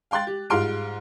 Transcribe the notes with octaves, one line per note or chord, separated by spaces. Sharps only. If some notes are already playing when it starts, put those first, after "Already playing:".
F5 G5 C6 F#6 A6
G4
G#2 G3 F4 C6 F6 D7